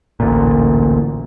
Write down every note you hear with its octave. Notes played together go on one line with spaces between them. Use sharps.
A1 D2 A#2